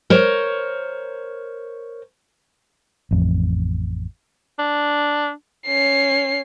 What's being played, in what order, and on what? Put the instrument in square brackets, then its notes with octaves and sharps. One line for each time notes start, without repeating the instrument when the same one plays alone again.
[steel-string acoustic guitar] A#4 C5 C#5
[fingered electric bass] A1 F2
[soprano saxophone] D4
[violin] C#4 C7